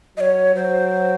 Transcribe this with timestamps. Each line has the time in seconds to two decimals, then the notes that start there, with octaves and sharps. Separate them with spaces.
0.17 F#3 C#5 D#5
0.55 F#3 C5